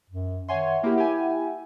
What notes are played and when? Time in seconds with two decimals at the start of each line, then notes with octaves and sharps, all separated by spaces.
0.10 F#2
0.49 D#3 C#5 E5 F#5 G#5 C6
0.83 A#3 E4 G4
0.97 G4 G#5